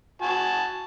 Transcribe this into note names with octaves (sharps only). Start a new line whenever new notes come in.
F#4 G#5 A5